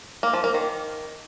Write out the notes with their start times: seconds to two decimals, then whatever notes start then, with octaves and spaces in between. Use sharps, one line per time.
0.23 A#3
0.33 F3
0.44 A#3
0.54 D#3